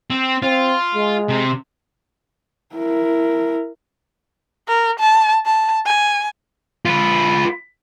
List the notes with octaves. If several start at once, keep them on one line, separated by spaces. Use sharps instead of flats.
C4
C4 F4
G#3
C3
E4 A#4
A#4
A5
A5
G#5
F4 B4